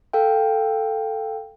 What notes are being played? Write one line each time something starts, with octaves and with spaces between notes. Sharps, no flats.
A4 F5 G5